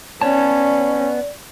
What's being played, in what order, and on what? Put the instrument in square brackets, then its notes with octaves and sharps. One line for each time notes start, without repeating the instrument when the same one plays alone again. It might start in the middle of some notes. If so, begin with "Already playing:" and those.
[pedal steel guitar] B3 C#5 A5 [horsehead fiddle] C#4 [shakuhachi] D5